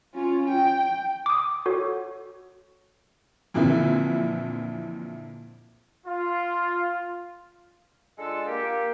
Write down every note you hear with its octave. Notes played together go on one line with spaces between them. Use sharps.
C#4 F4
G5
D6 D#6
F#4 A4 C#5
F2 A#2 D3 E3 E4
F4
D3 G#3 D4 F4 A4
A#3 G4